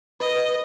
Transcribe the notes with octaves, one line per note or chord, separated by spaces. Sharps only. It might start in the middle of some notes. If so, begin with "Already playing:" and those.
B4 D#5